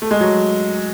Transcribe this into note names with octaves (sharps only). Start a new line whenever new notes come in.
A3
G#3
F#3